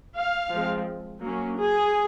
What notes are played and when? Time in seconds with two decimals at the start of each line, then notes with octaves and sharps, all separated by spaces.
0.17 F5
0.53 F3 G#3 C4
1.23 F#3 A#3 C#4
1.59 G#4